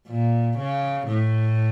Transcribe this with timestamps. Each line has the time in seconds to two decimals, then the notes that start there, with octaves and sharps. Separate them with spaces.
0.08 A#2
0.58 C#3
1.07 A2